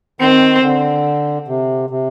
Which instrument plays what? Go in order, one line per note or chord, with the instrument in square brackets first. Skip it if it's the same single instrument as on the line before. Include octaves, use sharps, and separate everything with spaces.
[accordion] D#3 [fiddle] C4
[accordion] D3
C3
C3